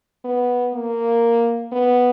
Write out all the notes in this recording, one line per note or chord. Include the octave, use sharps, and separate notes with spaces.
B3
A#3
B3